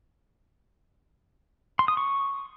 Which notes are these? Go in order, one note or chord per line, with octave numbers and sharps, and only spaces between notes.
C6
D#6
C#6